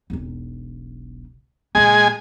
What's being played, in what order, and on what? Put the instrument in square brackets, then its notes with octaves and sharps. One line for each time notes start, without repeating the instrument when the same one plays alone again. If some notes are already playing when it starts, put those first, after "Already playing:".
[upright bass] E1 B1
[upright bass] A#2 A#3 [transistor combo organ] G#3 G#5